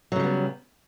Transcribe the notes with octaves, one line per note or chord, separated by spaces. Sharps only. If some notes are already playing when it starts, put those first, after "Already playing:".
C#3 F#3 G3 B3